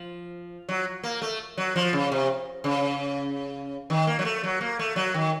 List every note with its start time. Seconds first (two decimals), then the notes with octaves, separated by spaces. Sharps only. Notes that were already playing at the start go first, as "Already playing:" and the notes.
Already playing: F3
0.69 F#3
1.04 A#3
1.22 A3
1.58 F#3
1.76 F3
1.93 C#3
2.12 C3
2.64 C#3
3.90 D#3
4.07 A#3
4.19 F#3
4.25 A3
4.44 F#3
4.61 A#3
4.79 A3
4.96 F#3
5.14 D#3